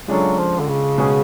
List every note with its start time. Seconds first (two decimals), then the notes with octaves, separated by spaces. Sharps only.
0.08 C#3 F#3 G#3 D4 F4 A4
0.38 F3
0.60 D3
0.68 C#3
0.98 B2 G#3 C#4 G#4